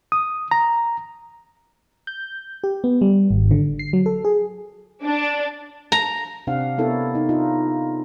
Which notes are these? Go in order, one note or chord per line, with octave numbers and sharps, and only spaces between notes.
D#6
A#5
G6
G4
B3
G3
G#1
D3
C7
F#3
A4
G#4
D4
A#5
C3 C4 D4 F5 F#5
B3 D4 E4 A4 A#4 C#5
D#4
D4 D#4 F4